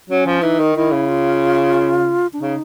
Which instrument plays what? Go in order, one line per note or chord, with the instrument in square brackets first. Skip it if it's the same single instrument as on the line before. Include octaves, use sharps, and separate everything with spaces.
[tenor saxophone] F#3 [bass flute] C#4
[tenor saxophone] F3
[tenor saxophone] E3 [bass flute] D#4
[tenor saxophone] D#3
[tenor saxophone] D#3 [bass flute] E4
[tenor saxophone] C#3
[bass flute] F4
D4
[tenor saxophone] C#3 [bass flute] D#4